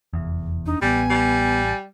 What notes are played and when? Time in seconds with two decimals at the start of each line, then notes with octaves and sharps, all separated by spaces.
0.13 F1 E2
0.66 D4 D#4
0.82 A1 G3 B3 G#5
1.10 G3